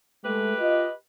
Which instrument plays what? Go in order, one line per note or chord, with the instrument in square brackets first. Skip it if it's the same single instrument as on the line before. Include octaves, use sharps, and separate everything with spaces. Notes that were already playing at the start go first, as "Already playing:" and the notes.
[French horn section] G#3 A3 [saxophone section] G4 B4
[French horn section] F4 D#5